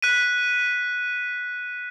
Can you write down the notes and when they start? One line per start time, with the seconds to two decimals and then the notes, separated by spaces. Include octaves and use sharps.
0.02 F#6 B6 D#7